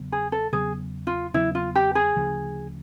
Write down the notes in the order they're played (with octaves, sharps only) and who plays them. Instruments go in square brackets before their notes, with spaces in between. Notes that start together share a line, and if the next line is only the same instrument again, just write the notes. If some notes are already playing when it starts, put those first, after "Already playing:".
Already playing: [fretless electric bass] E2 C#3 F#3 B3
[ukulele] G#4
A4
[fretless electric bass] E2 C#3 F#3 B3 [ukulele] G#4
[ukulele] F4
[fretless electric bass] E2 C#3 F#3 B3 [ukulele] E4
[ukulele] F4
G4
G#4
[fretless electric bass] D2 C#3 F3